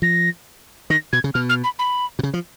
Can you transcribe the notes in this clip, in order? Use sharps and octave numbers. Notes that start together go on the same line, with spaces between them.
F3 A#6
D#3 A#6
B2 G#6
C#3
B2 F6
F6
B5
B5
B2
C#3
F3